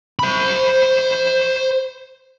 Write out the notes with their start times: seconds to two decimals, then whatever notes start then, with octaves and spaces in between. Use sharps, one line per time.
0.19 C5 B5